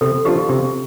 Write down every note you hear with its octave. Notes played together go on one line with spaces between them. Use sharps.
C3 A4
F3 D4 F4 G4
C3 G4